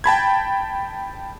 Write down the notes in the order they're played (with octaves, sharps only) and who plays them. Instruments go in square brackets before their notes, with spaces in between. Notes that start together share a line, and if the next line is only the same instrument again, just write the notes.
[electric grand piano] G5 A5 B5 G#6